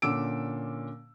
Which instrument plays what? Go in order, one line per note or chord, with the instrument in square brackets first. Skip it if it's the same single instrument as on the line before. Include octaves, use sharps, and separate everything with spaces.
[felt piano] A#2 D3 C#4 D6 E6 D7